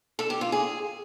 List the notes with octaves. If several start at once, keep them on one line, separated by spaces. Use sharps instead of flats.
A4
G4
F4
G#4